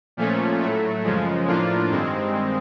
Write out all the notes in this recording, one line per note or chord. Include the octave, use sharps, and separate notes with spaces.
A#2 F3 A3 C#4
A2 F#3 A3
F#2 C#3 F3 G#3
A2 F3 A#3 D4 F4
G2 D#3 G#3 C4